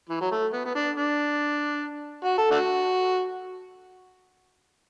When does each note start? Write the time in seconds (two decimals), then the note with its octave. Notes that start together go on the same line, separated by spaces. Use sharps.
0.09 E3
0.20 F#3
0.31 A3
0.52 B3
0.65 B3
0.75 D4
0.96 D4
2.24 F#4
2.37 A4
2.51 A3 D4 F#4